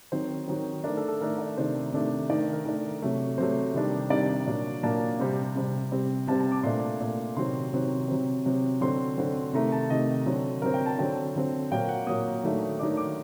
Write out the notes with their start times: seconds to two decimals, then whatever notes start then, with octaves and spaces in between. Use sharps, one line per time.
0.12 D#3 F#3 C4 C5
0.48 D#3 F#3 C4
0.84 D#3 A3 D4 A#4
0.97 A4
1.08 A4
1.21 D#3 A3 D4 A#4
1.38 D5
1.57 C3 D#3 A3 D4 C5
1.93 C3 D#3 A3 D4
2.30 D#3 A3 D4 D5
2.53 A#4
2.65 D#3 A3 D4 A#4
3.02 C3 F#3 A3
3.38 C3 F#3 A3 C5
3.74 C3 D#3 G3 D4
4.10 C3 D#3 G3 D4 D5
4.46 A#2 F#3 A#3 D4
4.83 A#2 F#3 A#3 D4 A5
5.20 C3 G3 C4
5.56 C3 G3 C4
5.92 C3 G3 C4
6.28 C3 G3 C4 A5
6.40 A5
6.52 D6
6.63 A#2 A3 D4 C6
7.00 A#2 A3 D4
7.36 C3 D#3 F#3 C4 C6
7.73 C3 D#3 F#3 C4
8.08 C3 F#3 C4
8.46 C3 F#3 C4
8.81 D3 F#3 C4 C6
9.18 D3 F#3 C4
9.53 C3 D#3 A3 A#5
9.72 A5
9.90 C3 D#3 A3 D#5
10.26 D3 F#3 C4
10.62 D3 F#3 C4 A#4
10.74 G5
10.86 A5
10.98 D3 F#3 C4 G5
11.35 D3 F#3 C4
11.71 A#2 F#3 A#3 G5
11.89 F#5
12.07 A#2 F#3 A#3 D#6
12.43 D#3 F#3 A3 D4
12.79 D#3 F#3 A3 D4 D6
12.97 D6